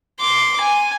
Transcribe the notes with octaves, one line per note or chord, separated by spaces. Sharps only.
C6 D6
G#5